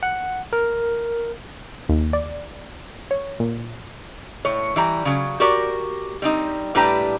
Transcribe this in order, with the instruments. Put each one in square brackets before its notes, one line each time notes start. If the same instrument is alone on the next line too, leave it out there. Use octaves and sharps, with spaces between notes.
[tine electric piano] F#5
A#4
[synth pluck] D#2
D5
C#5
A#2
[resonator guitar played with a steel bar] A2 C#5
E3 G3 A#5
C#3 F#3
F#4 G4 A#4 D5
G3 C4 D#4
A2 G3 D4 G4 B4 A#5